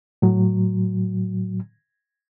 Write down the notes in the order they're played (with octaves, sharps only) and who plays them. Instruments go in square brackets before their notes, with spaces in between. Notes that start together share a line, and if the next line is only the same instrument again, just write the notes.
[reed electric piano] A2 F#3